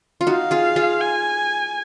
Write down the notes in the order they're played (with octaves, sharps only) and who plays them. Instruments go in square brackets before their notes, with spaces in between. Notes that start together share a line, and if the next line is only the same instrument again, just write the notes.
[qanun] F4
[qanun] D#4 F#4 [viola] F5
[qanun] F4 G#4
F4 G#4
[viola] G#5